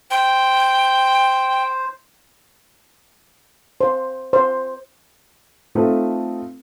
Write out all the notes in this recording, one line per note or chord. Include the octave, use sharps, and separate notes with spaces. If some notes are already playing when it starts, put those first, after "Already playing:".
C5 G5
C5
C5
A3 C4 D#4 F4 A4 B4